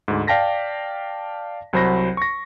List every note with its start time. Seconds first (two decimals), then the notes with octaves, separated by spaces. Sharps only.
0.08 D2 G#2
0.27 D5 F5 G5 A5 A#6 B6
1.73 C2 F#3 C5 B5 A#6
2.17 C#6 A#6